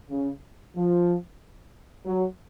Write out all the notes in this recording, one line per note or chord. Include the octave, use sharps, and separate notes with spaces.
C#3
F3
F#3